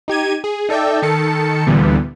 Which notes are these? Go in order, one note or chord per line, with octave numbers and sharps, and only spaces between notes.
D#4 G4 G#6 D#7
G#4
D#4 A4 D5 E5 G5
D#3 A4 A5 C#7
D2 A#2 D3 E3 G3 B3